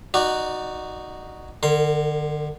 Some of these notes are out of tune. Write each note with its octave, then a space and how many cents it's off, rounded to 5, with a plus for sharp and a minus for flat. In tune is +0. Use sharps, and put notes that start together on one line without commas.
D#4 +0 F#4 +0 D5 +20
D3 +30 A#4 -25 C6 +0